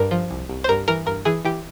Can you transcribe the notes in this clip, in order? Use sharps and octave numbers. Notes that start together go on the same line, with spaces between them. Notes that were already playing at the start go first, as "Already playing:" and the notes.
Already playing: G2 A#4
F3
C2
C2
C5
G2 A#4
E3 A#4
G2 A#4
E3 G#4
E3 G4